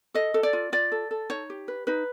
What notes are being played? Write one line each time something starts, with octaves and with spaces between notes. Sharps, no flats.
A4 D#5
A4
D5
F4
F4 D5
A4
A4
D#4 C#5
G4
B4
D#4 B4